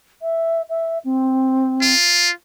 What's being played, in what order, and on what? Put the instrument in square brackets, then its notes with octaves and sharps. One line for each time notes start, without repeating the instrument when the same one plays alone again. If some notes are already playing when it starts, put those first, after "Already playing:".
[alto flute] E5
E5
C4
[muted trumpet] F4